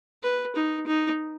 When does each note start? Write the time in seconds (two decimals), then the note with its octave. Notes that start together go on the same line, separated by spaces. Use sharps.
0.23 B4
0.56 D#4
0.87 D#4